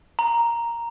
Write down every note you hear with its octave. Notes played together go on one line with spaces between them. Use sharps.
A#5